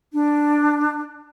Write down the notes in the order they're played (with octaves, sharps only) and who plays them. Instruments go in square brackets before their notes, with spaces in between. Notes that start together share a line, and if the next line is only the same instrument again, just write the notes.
[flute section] D4